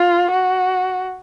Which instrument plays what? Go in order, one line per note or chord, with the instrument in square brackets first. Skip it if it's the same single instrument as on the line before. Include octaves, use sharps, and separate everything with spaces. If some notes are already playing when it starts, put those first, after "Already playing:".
Already playing: [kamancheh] F4
F#4